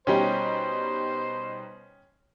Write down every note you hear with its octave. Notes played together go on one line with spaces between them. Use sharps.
B2 G3 C#4 D#4 C5 G5